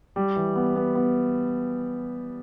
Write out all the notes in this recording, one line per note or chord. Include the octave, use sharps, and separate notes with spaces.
G3
E3
B3
B3
B3